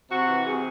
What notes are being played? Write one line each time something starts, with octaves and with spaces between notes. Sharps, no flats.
C3 F#4
E3
C3 G#4